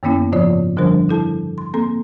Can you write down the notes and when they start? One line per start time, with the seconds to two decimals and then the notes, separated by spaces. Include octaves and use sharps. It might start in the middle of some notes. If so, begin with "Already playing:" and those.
0.03 F#2 D#3 A#3 B3 C#4 E4
0.32 G#2 C#3 F3 F4 C#5 D5
0.77 D3 F3 G3 D4 A#4 C5
1.09 E4 A4 A5
1.58 C6
1.74 A#3 C4 A4 C6